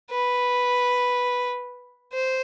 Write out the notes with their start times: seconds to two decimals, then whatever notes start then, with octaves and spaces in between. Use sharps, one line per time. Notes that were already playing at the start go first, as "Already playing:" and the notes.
0.11 B4
2.13 C5